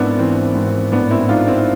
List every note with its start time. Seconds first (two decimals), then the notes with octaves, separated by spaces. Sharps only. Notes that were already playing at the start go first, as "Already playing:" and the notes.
Already playing: G#1 G#2 B3 C4 D4 E4
0.19 E3 C4
0.55 G#1 C4
0.92 A1 B3 D4
1.11 C4 E4
1.21 E4
1.29 G#2 D4 F4
1.48 C4 E4